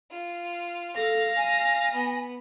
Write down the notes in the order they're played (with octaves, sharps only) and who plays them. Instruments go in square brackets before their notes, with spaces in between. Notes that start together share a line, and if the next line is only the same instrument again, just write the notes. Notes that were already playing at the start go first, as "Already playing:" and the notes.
[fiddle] F4
[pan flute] A4 [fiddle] F5 [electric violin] A#6
[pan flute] G#5
[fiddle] B3